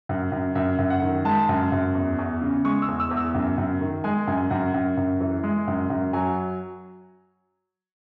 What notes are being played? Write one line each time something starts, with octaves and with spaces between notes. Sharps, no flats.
F#2
F#2
F#2 E5
F#2
F#5
D#3
G#3 A5
F#2
F#2
E2
E2
C#3
G#3 C#6
E6
E2
E6
E2
E6
F#2
F#2
D#3
G#3 G#5
F#2 G#5
F#2 F#5
F#2
F#2
E3
G#3
F#2
F#2
F#3 G#5